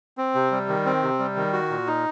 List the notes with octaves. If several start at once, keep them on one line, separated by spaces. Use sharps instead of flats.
C4
C3
G3
D#3
C4
C3
G3
D#3
F#4
A#2
D#4